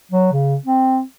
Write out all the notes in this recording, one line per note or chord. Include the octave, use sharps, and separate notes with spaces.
F#3
C#3
C4